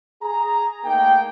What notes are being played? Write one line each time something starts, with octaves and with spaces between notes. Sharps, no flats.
G#4 A#5
A3 A#3 D#4 G#4 G5